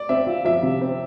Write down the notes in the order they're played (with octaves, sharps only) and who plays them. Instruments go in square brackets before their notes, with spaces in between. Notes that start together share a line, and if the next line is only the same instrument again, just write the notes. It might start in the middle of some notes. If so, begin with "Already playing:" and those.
Already playing: [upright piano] D5
[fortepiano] C4 [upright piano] E5
[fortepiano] F4
[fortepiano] F3 [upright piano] E5
[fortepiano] C3
C4